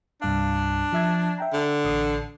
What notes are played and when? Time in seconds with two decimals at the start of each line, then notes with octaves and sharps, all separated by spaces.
0.22 C2 G2 D4 F5
0.93 F3 E5 G#6
1.38 E5 G5 A#5
1.53 D3
1.85 A1 D#6 C7